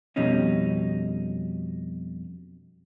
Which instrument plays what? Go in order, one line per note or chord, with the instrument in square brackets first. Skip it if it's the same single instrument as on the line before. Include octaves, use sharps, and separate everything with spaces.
[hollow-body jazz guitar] F2 B2 G3 C#4 D#4